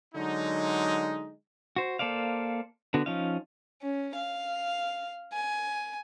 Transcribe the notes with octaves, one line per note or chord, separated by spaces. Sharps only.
D3 F#3 G#3 D#4
F#4 C5
A#3 A4 C5 D5 F5
D3 B3 F#4
F3 C#4 D#4 F5
C#4
F5
G#5